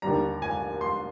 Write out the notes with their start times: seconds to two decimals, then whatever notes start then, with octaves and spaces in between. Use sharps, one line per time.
0.02 D#2 D3 G3 A#5
0.42 G#5
0.81 C6